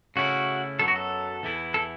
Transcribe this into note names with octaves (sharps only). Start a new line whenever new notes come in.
C#3 A3 C#4 E4 F#4
F#2 F#3 B3 A4
F#4
A4
E2 E3 B3 E4
A4